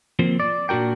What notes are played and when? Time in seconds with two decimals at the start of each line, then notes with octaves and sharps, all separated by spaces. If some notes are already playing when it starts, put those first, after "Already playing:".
0.19 F3 A#3 C4
0.40 D5
0.69 A#2 D4 F#4 A#4 G5